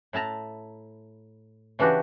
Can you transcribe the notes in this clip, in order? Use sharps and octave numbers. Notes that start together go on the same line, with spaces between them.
A2 E4 A5 A#5
C#3 E3 D4 F#4 G4